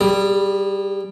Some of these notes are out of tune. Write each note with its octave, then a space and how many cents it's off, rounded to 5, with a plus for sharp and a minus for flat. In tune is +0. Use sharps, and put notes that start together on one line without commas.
G3 +0 G#4 -30